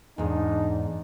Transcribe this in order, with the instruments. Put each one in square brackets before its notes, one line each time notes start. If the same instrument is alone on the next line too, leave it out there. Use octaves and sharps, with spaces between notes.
[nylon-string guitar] E2 G#2 [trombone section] D4 D#4